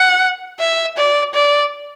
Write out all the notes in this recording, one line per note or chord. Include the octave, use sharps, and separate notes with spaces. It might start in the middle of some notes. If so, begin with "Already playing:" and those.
Already playing: F#5
E5
D5
D5